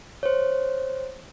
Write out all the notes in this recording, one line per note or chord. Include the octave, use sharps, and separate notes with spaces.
C5 C#5